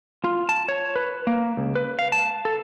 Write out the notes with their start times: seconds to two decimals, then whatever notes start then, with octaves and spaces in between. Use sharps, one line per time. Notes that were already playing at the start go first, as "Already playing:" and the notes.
0.24 F4
0.49 A5
0.68 C#5
0.96 B4
1.27 A#3
1.57 C#2
1.75 B4
1.99 F5
2.12 A5
2.45 A4